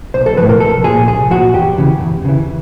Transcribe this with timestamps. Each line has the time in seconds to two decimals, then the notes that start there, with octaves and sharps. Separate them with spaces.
0.14 B1 C5
0.26 A4
0.37 A2 F3 B4
0.49 A#4
0.60 C2 A4
0.84 A#2 F3 G#4
1.07 C2 G#4
1.31 A#2 F3 F#4
1.54 E2 G4
1.78 C#3 E3
2.00 E2
2.25 C#3 E3